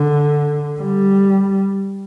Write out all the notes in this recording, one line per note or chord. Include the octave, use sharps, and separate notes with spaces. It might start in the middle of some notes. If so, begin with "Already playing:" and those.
Already playing: D3
G3